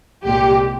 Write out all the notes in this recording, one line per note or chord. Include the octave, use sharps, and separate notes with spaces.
C2 A#2 G#3 G4